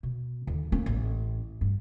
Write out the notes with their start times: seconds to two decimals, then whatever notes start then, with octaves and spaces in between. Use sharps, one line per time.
0.03 B2
0.47 D#2 D3
0.72 A#3 C#4
0.86 A1
1.61 G2